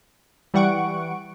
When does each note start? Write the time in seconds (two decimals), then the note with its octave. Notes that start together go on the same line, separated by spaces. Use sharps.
0.54 E3 G3 F#5 C#6 D7